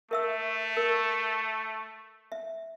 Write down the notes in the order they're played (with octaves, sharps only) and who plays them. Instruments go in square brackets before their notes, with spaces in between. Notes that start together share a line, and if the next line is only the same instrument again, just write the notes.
[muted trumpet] A3 [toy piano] A#4 E5 E6
[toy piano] A#4
E5